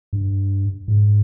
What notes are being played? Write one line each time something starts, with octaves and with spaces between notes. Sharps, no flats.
G2
G#2